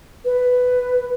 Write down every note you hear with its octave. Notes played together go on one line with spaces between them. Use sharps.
B4